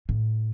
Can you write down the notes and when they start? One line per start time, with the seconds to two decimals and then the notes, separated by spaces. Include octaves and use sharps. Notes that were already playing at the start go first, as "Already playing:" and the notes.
0.09 A2